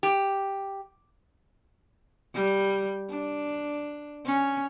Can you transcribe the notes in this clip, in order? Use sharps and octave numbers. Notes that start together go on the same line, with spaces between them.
G4
G3
D4
C#4